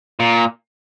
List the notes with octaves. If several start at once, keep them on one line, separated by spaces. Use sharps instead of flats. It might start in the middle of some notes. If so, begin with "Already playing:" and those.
A#2